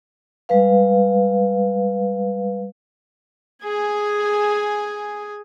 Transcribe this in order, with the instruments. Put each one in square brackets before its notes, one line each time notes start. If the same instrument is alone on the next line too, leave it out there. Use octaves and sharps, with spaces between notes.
[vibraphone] G3 G#3 B4 F5
[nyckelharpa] G#4 G#5